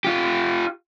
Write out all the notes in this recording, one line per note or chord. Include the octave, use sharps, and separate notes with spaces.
F4 G4